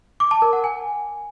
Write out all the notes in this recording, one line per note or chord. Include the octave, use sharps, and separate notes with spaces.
D6
A5
A#4
F#5
G#5